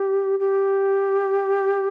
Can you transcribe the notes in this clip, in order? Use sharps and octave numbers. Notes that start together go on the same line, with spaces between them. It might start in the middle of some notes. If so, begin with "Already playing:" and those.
Already playing: G4
G4